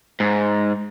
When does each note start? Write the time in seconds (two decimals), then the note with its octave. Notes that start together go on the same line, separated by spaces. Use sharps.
0.20 G#2